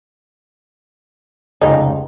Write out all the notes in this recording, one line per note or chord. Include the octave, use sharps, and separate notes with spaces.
F1 C#2 D#4